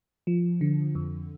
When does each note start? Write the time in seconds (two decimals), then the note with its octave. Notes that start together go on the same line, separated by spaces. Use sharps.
0.27 F3
0.61 D3
0.95 F2